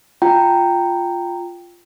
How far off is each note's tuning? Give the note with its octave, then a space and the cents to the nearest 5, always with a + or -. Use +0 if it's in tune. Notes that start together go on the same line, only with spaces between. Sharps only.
F4 +0 G5 +0 A#5 -15